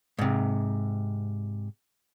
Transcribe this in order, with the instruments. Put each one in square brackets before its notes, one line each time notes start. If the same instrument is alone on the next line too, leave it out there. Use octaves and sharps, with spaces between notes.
[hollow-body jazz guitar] G#2 C3